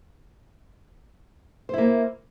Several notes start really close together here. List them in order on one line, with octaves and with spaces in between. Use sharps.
C5 E4 A#3